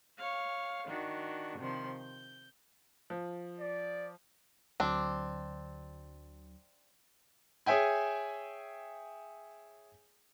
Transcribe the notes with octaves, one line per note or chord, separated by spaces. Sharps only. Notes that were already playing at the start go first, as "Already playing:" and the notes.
C#5 F5
D#3 D4 F#4
C3 D#3 F3 C6
G6
F3
D5
D2 D3 F#3 C4 D4
G#4 C#5 E5 G5 G#5